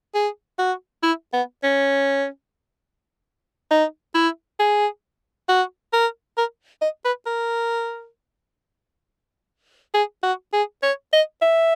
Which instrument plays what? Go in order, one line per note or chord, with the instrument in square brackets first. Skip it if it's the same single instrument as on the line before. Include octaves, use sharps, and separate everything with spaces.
[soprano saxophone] G#4
F#4
E4
B3
C#4
D#4
E4
G#4
F#4
A#4
A#4
D#5
B4
A#4
G#4
F#4
G#4
C#5
D#5
E5